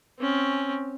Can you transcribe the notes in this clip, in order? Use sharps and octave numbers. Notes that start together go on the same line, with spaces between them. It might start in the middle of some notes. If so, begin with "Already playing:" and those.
C4 C#4